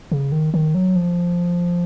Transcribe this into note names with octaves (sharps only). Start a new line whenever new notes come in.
C#3
D#3
D#3
F#3
F3